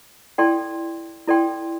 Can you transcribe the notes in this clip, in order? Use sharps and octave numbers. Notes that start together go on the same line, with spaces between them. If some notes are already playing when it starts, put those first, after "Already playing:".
E4 A4 D5 G5 C6
E4 A4 D5 G5 C6